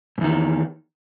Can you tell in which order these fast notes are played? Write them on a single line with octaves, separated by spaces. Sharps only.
G#2 E2 D#3